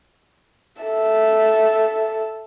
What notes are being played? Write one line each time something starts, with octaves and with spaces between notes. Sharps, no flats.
A4 E5